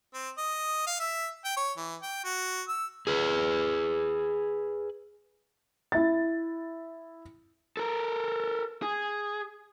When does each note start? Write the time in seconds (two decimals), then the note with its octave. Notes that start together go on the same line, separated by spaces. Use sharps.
0.14 C4
0.38 D#5
0.87 F5
1.00 E5
1.45 G5
1.57 C#5
1.77 E3
2.02 G5
2.24 F#4
2.69 E6
3.07 G#4 B4
5.92 E4 A6
7.77 A4 A#4
8.82 G#4